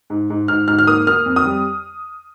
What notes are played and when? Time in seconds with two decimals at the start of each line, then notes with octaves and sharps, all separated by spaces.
0.10 G#2
0.30 G#2
0.48 G#2 F6
0.68 G#2 F6
0.79 F6
0.87 A#3 D#6
1.07 A#3 F6
1.26 F2
1.36 D#6
1.45 G3